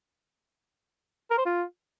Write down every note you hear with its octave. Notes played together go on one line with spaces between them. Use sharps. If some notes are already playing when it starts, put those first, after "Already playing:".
A#4
C5
F4